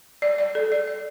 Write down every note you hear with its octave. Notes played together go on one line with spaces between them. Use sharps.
D5
D5
A4
D5
D5